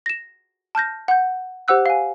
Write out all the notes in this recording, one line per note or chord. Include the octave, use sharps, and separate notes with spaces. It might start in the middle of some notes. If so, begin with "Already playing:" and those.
A#6 E7
A5 F6 G6 A#6
F#5 G6
G4 C5 F#5 E6 F#6
F5 G#5